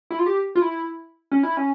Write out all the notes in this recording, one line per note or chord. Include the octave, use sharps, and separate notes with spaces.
E4
F4
G4
F4
E4
C#4
E4
C#4